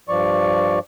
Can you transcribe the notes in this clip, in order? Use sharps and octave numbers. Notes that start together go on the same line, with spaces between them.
G2 F3 D5 C#6